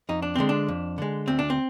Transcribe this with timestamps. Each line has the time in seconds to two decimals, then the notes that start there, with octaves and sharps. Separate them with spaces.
0.09 F2 D#4
0.22 D4
0.36 D3 G#3 C4
0.49 D4
0.68 F2
0.98 D3 G#3
1.28 D2 C4
1.39 D4
1.50 C4